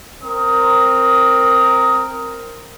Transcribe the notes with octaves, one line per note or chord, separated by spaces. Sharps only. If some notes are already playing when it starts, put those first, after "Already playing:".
C4 A#4 D#6